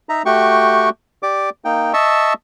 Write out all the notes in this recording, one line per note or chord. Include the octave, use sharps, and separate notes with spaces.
D#4 E5 A#5
A3 F#4 G4 G5 C#6
G4 D5 D6
A#3 D#4 G5
D#5 E5 A5 C#6 E6